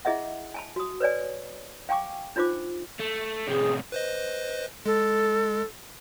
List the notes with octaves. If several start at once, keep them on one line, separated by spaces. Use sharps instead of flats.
E4 G#4 D#5 E5 F#5
G#5 A5 B5
F#4 D#6
B4 C#5 D5 G#5
F5 G5 G#5 C#6 D6
D4 D#4 F4 C5 D6
A3
A2 C3 G#4
B4 C5 D#5
G#3 A4